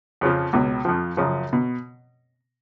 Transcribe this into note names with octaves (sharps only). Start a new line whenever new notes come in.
F2 C#3 F3
C#2 B2
F2 F3
F#2 C#3 F3
B2